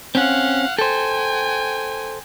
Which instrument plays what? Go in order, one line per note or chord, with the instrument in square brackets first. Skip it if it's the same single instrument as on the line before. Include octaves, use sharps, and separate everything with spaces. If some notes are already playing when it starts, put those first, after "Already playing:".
[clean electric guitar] C4 C#4 [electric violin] F5 F#5
[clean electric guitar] A4 C5 [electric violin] G5 G#5